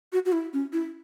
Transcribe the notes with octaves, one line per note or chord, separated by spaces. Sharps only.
F#4
F#4
E4
C#4
E4